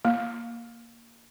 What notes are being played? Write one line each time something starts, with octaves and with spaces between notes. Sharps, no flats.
A#3